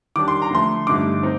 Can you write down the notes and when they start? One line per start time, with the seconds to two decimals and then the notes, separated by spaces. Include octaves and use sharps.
0.16 D#3 G3 D4 D6
0.28 C6
0.42 A#5
0.51 D3 F3 A3 C6
0.87 G2 D3 A3 D#4 D6
1.23 C4 D#4